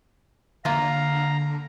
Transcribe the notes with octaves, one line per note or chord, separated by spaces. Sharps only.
D3 A#3 F4 F5 A#5